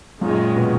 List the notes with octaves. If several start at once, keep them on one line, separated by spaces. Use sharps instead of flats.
F#2 A#2 D#3 G#3 C#4
B2